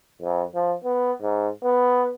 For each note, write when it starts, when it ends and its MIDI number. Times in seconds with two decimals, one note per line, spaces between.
0.22 0.43 41
0.55 0.74 53
0.84 1.12 59
1.22 1.48 44
1.64 2.13 59